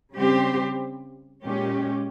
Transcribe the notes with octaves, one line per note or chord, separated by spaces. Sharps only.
C#3 G3 C4 G4 C5
A#2 G#3 C#4 G4